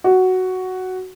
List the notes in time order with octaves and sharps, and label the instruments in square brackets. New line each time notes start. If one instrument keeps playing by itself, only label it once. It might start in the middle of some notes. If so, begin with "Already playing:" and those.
[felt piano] F#4